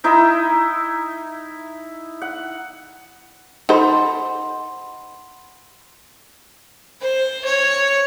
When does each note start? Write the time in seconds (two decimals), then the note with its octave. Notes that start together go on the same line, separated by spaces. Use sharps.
0.04 D#4 E4 D#5 E5
2.21 F#5
3.69 D#4 A4 C5 F#5 B5 C6
7.01 C5
7.45 C#5